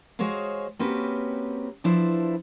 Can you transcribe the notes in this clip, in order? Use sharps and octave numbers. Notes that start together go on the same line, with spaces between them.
G#3 F#4 G#4 C5 C#5 F5
A#3 C4 C#4 F#4 G4 B4
F3 D4 E4 B4 C5